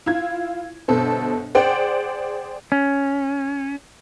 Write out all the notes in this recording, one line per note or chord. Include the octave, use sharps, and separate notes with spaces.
E4 F4 G#6
G1 B2 A4 C5
G#4 C5 D5 F#5 G5
C#4